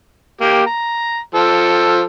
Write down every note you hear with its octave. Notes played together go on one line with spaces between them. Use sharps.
A#3 G4
A#5
F3 A4